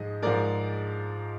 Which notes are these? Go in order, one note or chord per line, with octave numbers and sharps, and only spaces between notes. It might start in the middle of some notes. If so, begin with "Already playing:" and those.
Already playing: G#2 F3 G#3 D#5
G#2 F3 G#3 A#4 D5